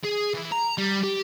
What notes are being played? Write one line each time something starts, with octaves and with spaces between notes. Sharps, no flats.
G#4
E3
A#5
G3
G4